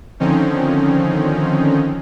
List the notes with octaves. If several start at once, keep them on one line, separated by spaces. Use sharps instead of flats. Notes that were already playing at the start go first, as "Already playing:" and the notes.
D3 D#3 F3 C4 C#4 D#4